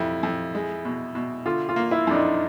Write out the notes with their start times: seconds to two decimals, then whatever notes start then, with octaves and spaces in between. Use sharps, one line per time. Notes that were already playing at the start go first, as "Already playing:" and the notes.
Already playing: F2 C3 E4
0.23 F2
0.55 G#3
0.85 B2
1.15 B2
1.46 D3 F4
1.69 F4
1.76 A#3
1.91 E4
2.07 F2 D4
2.14 D#4